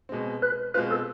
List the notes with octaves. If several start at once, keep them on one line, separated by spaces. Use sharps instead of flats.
B2 G#3 C4
B4
B2 G#3 C4 F4 B4
A4